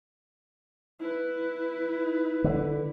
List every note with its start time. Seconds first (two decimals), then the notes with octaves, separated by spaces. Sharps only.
0.99 E4 B4
2.44 D3